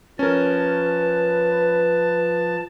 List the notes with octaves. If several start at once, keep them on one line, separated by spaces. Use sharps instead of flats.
F3 C#4 A#4 B4 A5